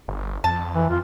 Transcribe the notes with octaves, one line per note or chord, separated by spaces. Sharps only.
G1
F2 A5
E3
F2 F4